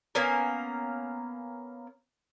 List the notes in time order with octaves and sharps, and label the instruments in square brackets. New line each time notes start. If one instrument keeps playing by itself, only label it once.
[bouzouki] A#3 B3 C#4 A#4